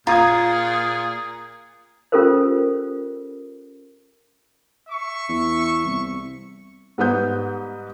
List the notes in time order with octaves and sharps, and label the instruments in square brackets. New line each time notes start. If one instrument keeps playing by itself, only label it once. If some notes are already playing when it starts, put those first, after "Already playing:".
[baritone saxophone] A#2 [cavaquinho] F4 [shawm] G#4 [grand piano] A#5 D#6 G#6
[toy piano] C#4 F4 G4 A4 A#4 C5
[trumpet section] E5 C#6
[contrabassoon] E2
C2
[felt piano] G#2 G3 B3 B4 D#6 G6